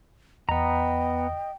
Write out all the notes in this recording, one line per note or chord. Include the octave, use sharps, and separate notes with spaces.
E2 B3 D#5 G5 A#5